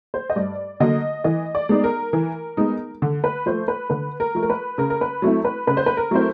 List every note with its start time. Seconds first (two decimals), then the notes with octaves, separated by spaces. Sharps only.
0.14 C5
0.30 D#5
0.36 G2 D5
0.80 D3 F#3 A#3 D#5
1.24 E3 D#5
1.55 D5
1.69 G#3 B3 D#4
1.84 A#4
2.13 E3
2.57 G#3 B3 D#4
3.02 D3
3.24 B4
3.46 F3 A3 C5
3.68 B4
3.90 D3 B4
4.20 A#4
4.35 F3 A3
4.42 A#4
4.50 B4
4.78 C#3 A#4
4.90 A#4
5.01 B4
5.22 F#3 A3 C4 E4
5.45 B4
5.67 C#3 B4
5.77 C5
5.86 B4
5.97 A#4
6.11 F#3 A3 C4 E4 C5